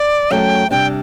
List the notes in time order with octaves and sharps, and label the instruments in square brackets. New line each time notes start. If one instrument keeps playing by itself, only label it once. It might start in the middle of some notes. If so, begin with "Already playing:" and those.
Already playing: [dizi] D5
[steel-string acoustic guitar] F#2 F#3 A3 [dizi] G5
[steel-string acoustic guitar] C3 G3 D4 [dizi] G5